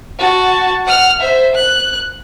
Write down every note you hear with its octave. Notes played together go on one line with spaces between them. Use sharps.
F#4 A5
F#5 F6
C5 E5
F#6